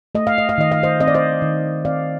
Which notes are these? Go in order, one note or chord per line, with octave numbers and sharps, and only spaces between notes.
A3 D#5
F5
D#5
F5
D#3 D#5
F5
C5 D#5
C4 D#5
D5
C5 D#5
D#3
C4 D5 F5